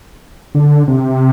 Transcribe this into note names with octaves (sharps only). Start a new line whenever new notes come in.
D3
C3